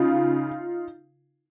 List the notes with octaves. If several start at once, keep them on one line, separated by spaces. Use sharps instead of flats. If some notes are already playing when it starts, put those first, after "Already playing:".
Already playing: C#3 D#4 F4